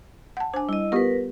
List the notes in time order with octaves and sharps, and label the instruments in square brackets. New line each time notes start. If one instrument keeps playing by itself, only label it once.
[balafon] F#5 A5
[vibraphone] D4 [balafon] C5 G#5
[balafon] G3 [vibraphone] E4 D#5
[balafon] B3 F4 G4 [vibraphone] A#4 B4